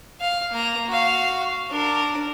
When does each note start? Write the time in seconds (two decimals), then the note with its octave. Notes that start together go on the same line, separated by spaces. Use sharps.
0.21 F5
0.52 A#3 A#5
0.88 F#4 F5
1.70 D4 A#4